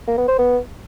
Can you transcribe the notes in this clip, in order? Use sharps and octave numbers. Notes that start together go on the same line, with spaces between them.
A#3
B3
C5
B3